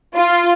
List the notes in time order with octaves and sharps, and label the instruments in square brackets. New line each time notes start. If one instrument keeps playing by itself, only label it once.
[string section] F4